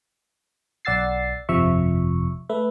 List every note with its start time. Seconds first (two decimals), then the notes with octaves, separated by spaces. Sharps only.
0.85 B1 D5 F#5 E6 A6 C7
1.49 G1 F2 C3 F3 E5 C#6
2.49 A3 B4 E5